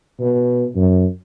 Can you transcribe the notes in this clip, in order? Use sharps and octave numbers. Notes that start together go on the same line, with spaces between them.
B2
F#2